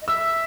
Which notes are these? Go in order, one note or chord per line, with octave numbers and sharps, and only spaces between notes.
D#5
E5 E6